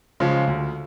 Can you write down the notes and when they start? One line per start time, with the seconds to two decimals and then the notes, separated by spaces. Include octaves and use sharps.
0.20 C#3 F3 G#3
0.47 D2